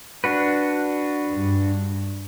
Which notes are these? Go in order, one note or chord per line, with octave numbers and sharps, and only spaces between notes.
D4 F#4 B4
G2